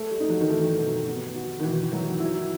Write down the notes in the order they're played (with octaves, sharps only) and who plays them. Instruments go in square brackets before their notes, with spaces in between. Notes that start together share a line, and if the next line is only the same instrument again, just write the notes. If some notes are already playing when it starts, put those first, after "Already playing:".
Already playing: [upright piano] A3
[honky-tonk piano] G3
[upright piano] D#4
[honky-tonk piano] F#3
D#3
[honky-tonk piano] E3 [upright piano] A3
[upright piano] B2
B3
F#4
[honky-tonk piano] D#3
[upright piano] B2 [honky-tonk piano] E3
[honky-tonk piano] E3 [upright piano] F#3
[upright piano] E4